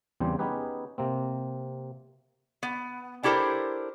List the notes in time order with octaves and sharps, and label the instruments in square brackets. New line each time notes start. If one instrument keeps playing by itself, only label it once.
[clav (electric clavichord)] E2 C#3 G3 C4 D4 C5
B3 C#4 D#4 G4 G#4 B4
C3 A#3 C4
[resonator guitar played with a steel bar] B3
D4 E4 G4 A4 A#4 C5